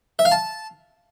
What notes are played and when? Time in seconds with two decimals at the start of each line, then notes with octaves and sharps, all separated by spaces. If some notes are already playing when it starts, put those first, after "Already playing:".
0.19 E5
0.25 F5
0.32 A5